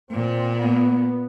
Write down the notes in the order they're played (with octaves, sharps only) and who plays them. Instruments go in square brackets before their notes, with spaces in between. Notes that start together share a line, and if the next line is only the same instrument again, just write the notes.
[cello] A#2 [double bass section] C4
[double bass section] B3